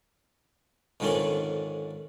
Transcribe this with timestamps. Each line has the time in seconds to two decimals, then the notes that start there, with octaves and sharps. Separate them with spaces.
1.00 F2 G#2 D3 D#3 C#4 D4